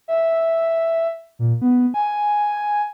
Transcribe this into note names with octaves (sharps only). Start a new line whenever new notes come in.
E5
A#2
B3
G#5